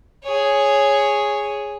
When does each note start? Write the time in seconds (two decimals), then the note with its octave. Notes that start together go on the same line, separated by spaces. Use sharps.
0.24 G#4 C#5